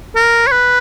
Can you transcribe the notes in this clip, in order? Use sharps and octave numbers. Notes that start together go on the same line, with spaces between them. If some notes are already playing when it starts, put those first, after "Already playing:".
A#4
C#5
B4